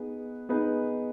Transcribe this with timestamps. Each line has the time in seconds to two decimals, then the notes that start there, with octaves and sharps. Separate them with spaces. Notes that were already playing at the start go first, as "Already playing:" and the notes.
Already playing: B3 D#4 G#4 B4
0.49 B3 D#4 G#4 B4